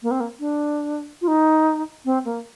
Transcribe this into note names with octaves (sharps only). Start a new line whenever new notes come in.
A#3
C4
A#3
D4
F4
D#4
C4
A#3